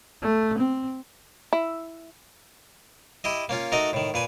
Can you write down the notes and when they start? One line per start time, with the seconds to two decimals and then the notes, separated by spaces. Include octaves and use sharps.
0.22 A3
0.58 C4
1.53 E4
3.24 E4 G4 D#5
3.49 A#3 C#4 F4
3.72 A3 D#4 F#4 A#4 D#5
3.93 A2 D#3
4.14 A#2 B4 G#5